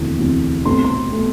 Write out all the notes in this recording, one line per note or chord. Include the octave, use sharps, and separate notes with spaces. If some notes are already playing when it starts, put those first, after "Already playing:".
Already playing: E1 D2 C3 E3
E1 D2 C3 E3
C2 B2 A3 C6
C6
B2 A3